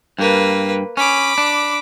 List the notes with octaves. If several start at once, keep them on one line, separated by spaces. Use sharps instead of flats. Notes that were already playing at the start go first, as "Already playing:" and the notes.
G2 A#3 B4
C#4 B5 D6
D4